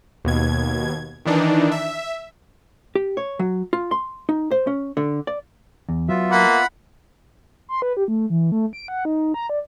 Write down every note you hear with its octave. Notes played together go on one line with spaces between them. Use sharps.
D#2 B2 G#6
D#3 E3 D4 D#4
E5
G4
C#5
F#3
F4
C6
D#4
C5
C#4
D3
D5
E2
F#3 B3 F4 E5
A#3 F#5 B5
C6
B4
G4
A3
E3
A3
D7
F#5
D#4
A#5
D5